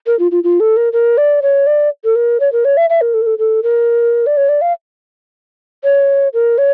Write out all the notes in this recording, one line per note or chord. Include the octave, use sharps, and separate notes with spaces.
A#4
F4
F4
F4
A4
A#4
A#4
D5
C#5
D5
A4
A#4
C#5
A#4
C#5
E5
E5
A#4
A4
A#4
A4
A4
A#4
D5
C#5
D5
F5
C#5
A#4
C#5